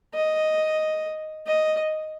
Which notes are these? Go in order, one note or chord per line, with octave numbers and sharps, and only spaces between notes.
D#5
D#5